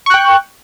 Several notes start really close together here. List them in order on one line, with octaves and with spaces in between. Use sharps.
C#6 F#6 G5